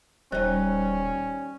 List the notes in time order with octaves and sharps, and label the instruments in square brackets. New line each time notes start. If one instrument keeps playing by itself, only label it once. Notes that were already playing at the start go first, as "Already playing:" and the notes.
[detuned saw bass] D#1 [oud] G3 D#4 [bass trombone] C#4 [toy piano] C5 A5